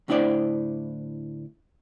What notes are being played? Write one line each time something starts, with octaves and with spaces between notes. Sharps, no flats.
D2 A2 D4 E4 C5 D5